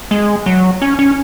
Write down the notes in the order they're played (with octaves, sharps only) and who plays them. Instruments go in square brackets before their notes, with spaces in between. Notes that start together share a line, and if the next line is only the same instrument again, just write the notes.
[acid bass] G#3
F#3
C#4
C#4